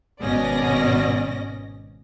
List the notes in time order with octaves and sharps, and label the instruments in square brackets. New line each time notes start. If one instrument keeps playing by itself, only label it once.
[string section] G#1 B2 C#4 D5 D#5 A#6